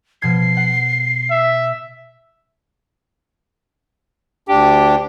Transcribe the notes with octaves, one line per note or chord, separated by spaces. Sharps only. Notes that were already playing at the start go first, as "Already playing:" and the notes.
B2 F3 G#6 C7
F#5
E5
D2 D4 G4